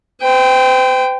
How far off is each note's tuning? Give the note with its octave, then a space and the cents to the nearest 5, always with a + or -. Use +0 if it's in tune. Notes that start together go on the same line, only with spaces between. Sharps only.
C5 -40 G5 +0